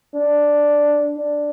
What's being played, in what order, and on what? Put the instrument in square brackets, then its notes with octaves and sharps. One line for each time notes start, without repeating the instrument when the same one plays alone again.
[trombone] D4
D4